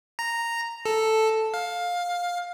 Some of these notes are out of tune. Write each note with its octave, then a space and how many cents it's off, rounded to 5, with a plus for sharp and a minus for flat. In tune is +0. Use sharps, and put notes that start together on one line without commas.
A#5 -5
A4 +0
F5 +15